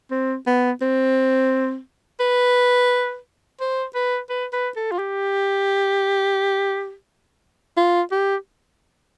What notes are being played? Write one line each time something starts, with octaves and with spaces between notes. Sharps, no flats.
C4
B3
C4
B4
C5
B4
B4
B4
A4
F4
G4
F4
G4